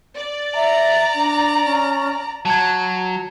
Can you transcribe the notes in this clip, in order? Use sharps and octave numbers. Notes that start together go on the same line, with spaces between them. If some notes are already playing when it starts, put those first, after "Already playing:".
D5
E5 A#5
D4
C#4
F#3 A5 G#6